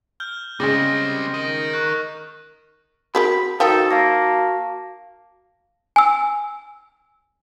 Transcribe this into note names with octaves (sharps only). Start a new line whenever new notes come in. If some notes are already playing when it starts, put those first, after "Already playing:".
F6 G6 G7
C#3 G3 G#3 C4 G#4 A6 A#6
A#4 D#5
C#6 F#6
C4 F#4 G#4 A#4 B5
D#3 F3 F#4 A4 G5 A#5 D#6
A#3 F5 A5 A#6
G#5 E6